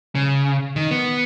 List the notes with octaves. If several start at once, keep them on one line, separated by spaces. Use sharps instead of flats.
C#3
D#3
B3